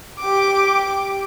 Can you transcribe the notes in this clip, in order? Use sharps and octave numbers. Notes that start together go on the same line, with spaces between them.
G4 D6